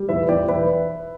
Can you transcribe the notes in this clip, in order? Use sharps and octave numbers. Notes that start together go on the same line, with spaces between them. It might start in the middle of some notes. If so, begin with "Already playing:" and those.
Already playing: G3
E2 B4 E5
E2 D5 G5
B1 B4 E5